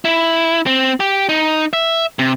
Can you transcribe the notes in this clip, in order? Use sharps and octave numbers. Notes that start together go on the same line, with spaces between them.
E4
C4
G4
D#4
E5
C3